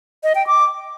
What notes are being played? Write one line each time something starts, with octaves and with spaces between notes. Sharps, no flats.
D#5
G5
D6